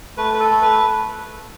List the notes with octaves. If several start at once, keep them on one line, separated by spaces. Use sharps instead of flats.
A3 B4
B4
A4
A3
B4